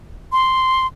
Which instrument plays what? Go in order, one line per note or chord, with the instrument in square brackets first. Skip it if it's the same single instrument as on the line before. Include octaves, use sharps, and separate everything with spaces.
[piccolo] C6